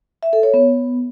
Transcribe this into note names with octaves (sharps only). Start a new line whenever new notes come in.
E5
A4
C#5
B3